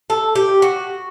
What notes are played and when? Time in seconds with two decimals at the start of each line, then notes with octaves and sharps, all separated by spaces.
0.10 A4
0.35 G4
0.62 F#4